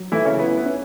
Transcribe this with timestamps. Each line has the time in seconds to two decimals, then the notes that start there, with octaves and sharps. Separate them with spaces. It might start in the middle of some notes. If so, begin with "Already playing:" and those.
Already playing: F#3
0.12 E3 A3 E4
0.25 C#3 C#4
0.39 B3 E4
0.57 B3
0.66 C#4